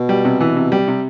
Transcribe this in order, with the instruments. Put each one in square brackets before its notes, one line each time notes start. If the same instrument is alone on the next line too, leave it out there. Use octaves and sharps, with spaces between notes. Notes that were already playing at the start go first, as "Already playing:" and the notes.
Already playing: [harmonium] B2
[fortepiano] G3
C3
E3
C3
G3
C3